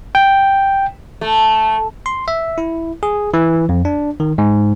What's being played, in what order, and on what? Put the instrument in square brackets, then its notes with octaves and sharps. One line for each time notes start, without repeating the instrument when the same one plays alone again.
[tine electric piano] G5
[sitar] A3
[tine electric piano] C6
E5
E4
G#4
E3
F2
D4
D#3
G#2